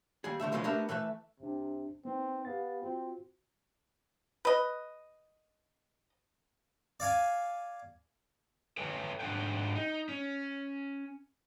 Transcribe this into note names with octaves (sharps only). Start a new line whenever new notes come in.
D#2 G3 G#4
D3 G3 A3 E5
C#3 F3 G#3 A3 B3 C#4
A3 B3 D4 G4 A#4 E5
E3 A3 B4 E5
C2 C3 D4
B3 C4 D#4
B3 G4 F5 A6
C4 F4 F#4
B4 D#5
D5 F5 G#5
A4 B4 C#5 G5
G#2 D4 A4 C5 F#5 G5
D#4
C#4